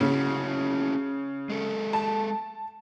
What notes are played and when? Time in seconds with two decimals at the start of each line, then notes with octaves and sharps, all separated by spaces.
0.01 C#3 C#4 E4 F#4
1.50 G#3 A4
1.93 A5